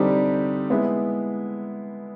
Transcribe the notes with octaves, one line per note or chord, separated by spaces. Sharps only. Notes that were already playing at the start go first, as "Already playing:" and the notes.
Already playing: D3 G3 C4 D#4 G4
G#3 B3 E4